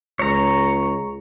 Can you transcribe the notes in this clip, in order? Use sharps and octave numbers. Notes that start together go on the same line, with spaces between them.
C#2 C#5 A#5